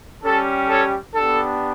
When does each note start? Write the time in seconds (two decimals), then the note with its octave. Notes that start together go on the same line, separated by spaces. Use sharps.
0.24 G3 C#4 G4 A4
0.68 A4 C#5
1.14 B3 D4 G4 A4